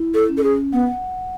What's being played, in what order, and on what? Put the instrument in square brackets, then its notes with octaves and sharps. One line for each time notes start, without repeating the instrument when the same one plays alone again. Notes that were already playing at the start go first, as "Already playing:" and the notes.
Already playing: [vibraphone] E4
[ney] A4
[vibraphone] C#4
[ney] A4
G#4
[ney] B3 [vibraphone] F#5